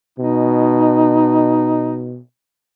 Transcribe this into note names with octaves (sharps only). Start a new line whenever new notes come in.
B2 D#4